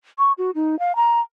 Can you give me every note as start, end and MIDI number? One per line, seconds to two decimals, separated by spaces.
0.18 0.32 85
0.38 0.51 66
0.55 0.79 63
0.79 0.96 77
0.96 1.20 82